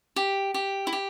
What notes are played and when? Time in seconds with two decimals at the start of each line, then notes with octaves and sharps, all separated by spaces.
0.16 G4
0.54 G4
0.87 E4
0.93 G4